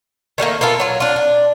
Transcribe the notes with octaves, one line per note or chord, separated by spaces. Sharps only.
D#3 G3 A3 A#3
A#3 B3 F4 A4
F#3 F4
D4 F4
D4